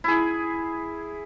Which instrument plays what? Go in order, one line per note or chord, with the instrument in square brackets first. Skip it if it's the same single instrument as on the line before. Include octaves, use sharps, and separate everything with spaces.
[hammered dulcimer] E4 G#4